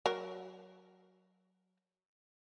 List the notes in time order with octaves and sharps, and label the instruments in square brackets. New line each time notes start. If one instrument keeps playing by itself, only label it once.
[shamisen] F#3 A#4